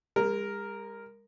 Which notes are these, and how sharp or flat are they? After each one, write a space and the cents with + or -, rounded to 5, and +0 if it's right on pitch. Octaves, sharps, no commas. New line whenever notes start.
G#3 -45 A#4 +0